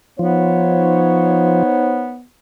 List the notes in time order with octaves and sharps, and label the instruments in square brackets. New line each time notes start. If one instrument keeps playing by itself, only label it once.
[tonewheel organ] F3 [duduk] B3 [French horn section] D#4 C5 C#5